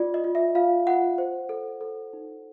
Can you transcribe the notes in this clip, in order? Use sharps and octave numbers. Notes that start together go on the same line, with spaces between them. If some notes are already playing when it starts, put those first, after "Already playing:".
Already playing: F4 D5
D#5
F4
E5
F4 F5
F4 F#5
C5
A4
A4
D#4